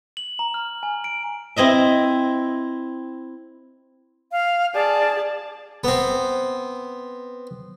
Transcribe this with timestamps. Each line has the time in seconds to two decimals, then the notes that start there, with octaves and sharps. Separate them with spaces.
0.17 F#7
0.39 A#5
0.54 F6
0.83 G#5
1.04 D7
1.56 C4 E4 D#5 E5
4.32 F5
4.74 G#4 D5 A5
5.84 B3 C4